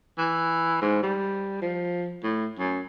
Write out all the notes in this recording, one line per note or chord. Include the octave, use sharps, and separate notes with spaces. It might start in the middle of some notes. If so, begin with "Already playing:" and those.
E3
G#2
G3
F3
A2
F#2